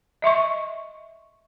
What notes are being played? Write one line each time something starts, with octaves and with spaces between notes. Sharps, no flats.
D#5 E5 C6 C#6